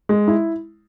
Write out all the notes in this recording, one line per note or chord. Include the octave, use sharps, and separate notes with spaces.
G#3
E4